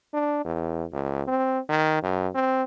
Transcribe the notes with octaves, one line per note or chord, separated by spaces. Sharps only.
D4
E2
C#2
C4
D#3
F#2
C4